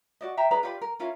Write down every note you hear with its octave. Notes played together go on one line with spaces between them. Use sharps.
F#4 D5 D#5
E5 G5 A#5
D4 G#4 B4 A#5
F4 G4 B4 D5
A#4
C#4 E4 F4 A#4